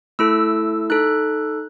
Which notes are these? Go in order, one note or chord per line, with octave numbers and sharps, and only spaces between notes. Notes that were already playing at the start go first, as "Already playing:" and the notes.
A3 E4 A4 E6
D#4 A4 F#6